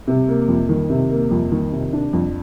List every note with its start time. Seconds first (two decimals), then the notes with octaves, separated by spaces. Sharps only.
0.07 C3
0.28 A#3
0.48 F2
0.69 D#3
0.90 C3
1.10 A#3
1.31 F2
1.52 D#3
1.72 C3
1.93 D4
2.13 F2